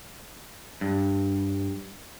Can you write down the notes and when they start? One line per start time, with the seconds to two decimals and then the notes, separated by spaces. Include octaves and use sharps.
0.81 G2